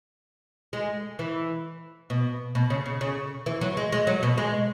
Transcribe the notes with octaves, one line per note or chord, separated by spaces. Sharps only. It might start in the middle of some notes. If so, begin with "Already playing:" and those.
G#3
E3
B2
B2
C#3
C#3
C#3
E3
F#3
G#3
G#3
F#3
B2
G#3